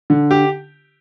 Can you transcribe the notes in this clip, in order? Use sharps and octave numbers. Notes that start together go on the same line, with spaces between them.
D3
G4